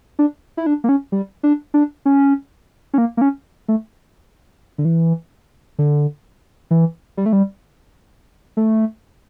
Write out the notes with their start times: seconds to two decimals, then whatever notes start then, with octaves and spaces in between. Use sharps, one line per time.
0.19 D4
0.57 E4
0.66 D4
0.84 A#3
0.89 C#4
1.12 G3
1.43 D4
1.74 D4
2.06 C#4
2.94 C#4
2.98 A#3
3.17 A#3
3.21 C#4
3.68 A3
4.78 D3
4.85 E3
5.79 D3
6.71 E3
7.17 G3
7.26 A3
7.33 G3
8.57 A3